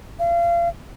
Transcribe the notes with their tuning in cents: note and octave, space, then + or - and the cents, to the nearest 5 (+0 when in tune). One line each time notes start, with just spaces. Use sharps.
F5 -35